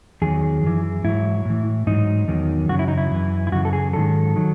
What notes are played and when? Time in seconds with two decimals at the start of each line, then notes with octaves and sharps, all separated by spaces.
0.22 E2 D#3 F#3 G#4
0.63 F#2 E3
1.04 G#2 F#3 E4
1.45 A2 E3
1.87 G#2 F#3 D#4
2.28 E2 D#3 F#3
2.69 F#2 C#3 F#3 F#4
2.79 E4
2.88 D#4
2.98 E4
3.11 F#2 E3
3.47 E4
3.52 F#2 C#3 E3 F#4
3.65 A4
3.73 G#4
3.93 G#2 D#3 F#3 A4
4.36 D#3 F#3